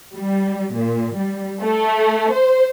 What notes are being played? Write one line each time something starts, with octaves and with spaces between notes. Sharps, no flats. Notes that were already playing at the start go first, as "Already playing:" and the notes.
G3
A#2
G3
A3
C5